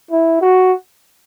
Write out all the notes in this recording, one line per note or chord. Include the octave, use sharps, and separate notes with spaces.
E4
F#4